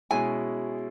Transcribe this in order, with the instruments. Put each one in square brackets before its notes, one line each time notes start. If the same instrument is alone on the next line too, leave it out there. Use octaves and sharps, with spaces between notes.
[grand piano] B2 G#3 C#4 E4 [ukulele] G#5